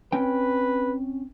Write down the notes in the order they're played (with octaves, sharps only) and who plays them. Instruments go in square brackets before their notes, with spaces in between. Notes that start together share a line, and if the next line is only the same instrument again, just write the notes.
[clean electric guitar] C4 C#4 G5 [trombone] B4